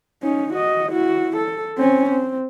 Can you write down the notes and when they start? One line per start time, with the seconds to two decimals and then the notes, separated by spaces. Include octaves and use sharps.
0.23 C#4 D#4
0.53 F#4 D#5
0.92 E4 F#4
1.37 A4
1.78 C4 C#4
2.10 C4